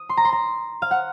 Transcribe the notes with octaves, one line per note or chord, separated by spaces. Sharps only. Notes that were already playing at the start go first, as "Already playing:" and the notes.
Already playing: D#6
C6
A#5
C6
A#5
F5
F#5